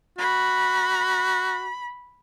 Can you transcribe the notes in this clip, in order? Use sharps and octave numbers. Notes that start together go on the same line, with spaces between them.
F#4 B5